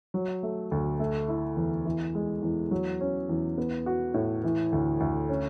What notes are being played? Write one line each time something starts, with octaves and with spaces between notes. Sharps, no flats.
F#3
A3
D2
A3
E4
E2
E3
G#3
E2
F#3
C#4
E2
B3
F#4
A2
E3
D2
D2
C#4